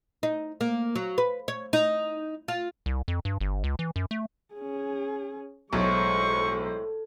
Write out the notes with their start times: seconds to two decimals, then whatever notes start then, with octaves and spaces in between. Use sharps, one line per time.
0.23 D#4
0.61 A#3
0.95 F#3
1.18 B4
1.48 C#5
1.73 D#4
2.48 F4
2.86 C2
3.08 F2
3.25 G2
3.41 G1
3.64 C#2
3.79 E3
3.96 F#2
4.11 A3
4.54 C#4 G#4
5.73 B1 A2 G#3 C5 C#6